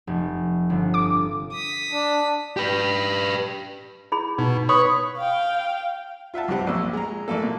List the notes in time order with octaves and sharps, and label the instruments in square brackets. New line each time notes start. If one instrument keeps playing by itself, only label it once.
[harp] F1
G1 D3
[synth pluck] D6
[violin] D#6 B6
[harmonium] D4
[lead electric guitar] G4 B4
[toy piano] E4 G#4 B5
[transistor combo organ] B2 [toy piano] D#4
[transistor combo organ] B4 C#5 [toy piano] B5 C#6 D#6
[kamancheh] F5 G5
[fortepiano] F4 E5 F#5 A5
C#2 G2 C3 C4 G4 F#5
A#1 A#2 E6
G#3 A#5
A1 A#3 A4
A#2